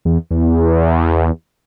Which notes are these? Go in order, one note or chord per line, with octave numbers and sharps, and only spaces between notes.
E2
E2